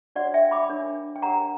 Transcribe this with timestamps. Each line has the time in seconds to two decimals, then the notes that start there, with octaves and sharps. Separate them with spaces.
0.16 D4 F#4 C#5 D5 F#5
0.34 E5 G5
0.51 B5 D6
0.69 D4 A#4 C#5
1.16 G5
1.22 D4 G4 A#4 C#5 F#5 A#5